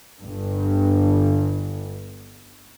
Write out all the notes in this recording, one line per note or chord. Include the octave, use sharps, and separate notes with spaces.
G1 G2